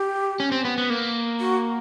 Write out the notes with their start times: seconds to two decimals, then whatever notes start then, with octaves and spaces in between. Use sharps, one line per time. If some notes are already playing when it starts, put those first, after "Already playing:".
Already playing: G4
0.40 C#4
0.52 C4
0.65 B3
0.78 B3
0.90 A#3
1.40 F#4